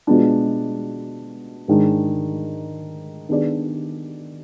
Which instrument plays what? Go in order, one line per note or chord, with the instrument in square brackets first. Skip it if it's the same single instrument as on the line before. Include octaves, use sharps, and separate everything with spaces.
[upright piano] B2 G#3 B3 D4 F4
G#2 D#3 G#3 D4
D#3 B3 D4 G#4 D5